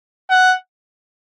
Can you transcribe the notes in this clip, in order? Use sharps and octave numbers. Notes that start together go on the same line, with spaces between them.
F#5